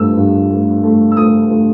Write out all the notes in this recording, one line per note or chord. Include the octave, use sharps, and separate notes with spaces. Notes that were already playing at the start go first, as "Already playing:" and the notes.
Already playing: G2 A3 E6
G2
A3
A3
E6
A3 D#6
A3